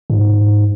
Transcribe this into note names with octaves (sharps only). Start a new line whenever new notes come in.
G#2